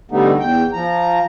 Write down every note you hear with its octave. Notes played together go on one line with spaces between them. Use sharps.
D3 G3 A3 B3 D#4
E2 G5
F3 A#5